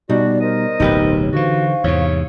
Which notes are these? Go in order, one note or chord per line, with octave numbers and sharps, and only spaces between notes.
B2 G3 D#4 F#4 D5
A#4 C5 D#5 A#5
D1 B1 D#4 G4 B4
C#5
D3 E3 F#4 C5 F5 C#6
E2 G#2 C3 C#5